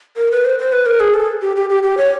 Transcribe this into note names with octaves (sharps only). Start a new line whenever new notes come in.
A#4
B4
C5
C5
B4
A#4
G#4
A4
G4
G4
G4
G4
C#5